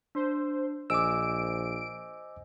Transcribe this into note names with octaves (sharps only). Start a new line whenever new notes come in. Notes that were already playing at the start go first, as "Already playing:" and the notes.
D4 C5
A#1 C5 D#5 G#5 D6 E6 D7